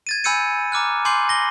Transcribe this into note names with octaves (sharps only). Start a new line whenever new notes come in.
G#6 A6 D#7
G#5 B5 E6 G6 C#7 D#7
A#5 D6 F6 F#6
G#5 C6 D6 G6 C7 F#7
A#6 G7